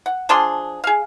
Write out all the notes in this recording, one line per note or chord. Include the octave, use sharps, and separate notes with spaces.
F#5
F3 D4 G#4 C6
G#4 F5